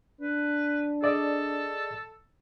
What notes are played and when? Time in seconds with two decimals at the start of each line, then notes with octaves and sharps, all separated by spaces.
0.21 D4 B4
1.02 G#4 A4 D5 D#5